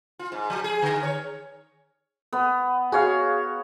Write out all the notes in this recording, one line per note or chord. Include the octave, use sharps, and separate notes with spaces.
F4
G#2
F3
G#4
D3
C#5
B3
F#4 G#4 C#5 F5